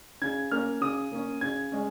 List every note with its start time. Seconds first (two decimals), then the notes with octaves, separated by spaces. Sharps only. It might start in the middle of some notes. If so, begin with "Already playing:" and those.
0.22 C#3 G#6
0.52 A#3 C#4 F6
0.81 C#3 D#6
1.12 A#3 C#4
1.41 C#3 G#6
1.72 G#3 C#4